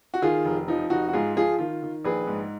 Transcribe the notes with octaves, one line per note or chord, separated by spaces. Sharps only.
F#4
D#3 F4 G#4
F1
F3 D#4
F1 D#4 F#4
F#4
G#2 F4 G#4
F3 F4 G#4
D#3 F4
D#3
A#1 G#4 B4
G#2